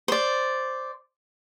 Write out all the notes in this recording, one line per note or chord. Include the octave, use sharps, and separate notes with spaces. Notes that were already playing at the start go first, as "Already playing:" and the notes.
C5 D5